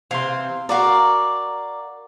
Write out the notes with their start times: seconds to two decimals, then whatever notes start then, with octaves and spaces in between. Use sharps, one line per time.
0.11 C3 E3 C4 F5 C6
0.69 F#4 A#4 D5 F5 A#5